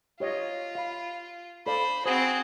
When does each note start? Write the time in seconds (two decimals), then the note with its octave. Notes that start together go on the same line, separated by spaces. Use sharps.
0.20 F4 G4 C#5 D#5
0.75 F5 B5
1.66 A4 C5 D5 F5 B5
2.06 C4 F#4 G#4 C5